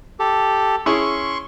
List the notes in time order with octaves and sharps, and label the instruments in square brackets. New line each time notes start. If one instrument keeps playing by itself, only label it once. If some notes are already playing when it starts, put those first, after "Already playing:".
[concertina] G4 A4
[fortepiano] C#4 E4 G#4 [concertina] C6 C#6